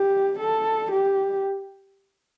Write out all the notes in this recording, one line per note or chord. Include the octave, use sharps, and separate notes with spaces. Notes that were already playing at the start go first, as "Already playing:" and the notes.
Already playing: G4
A4
G4